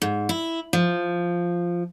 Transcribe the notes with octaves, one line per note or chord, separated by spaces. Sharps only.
G#2
E4
F3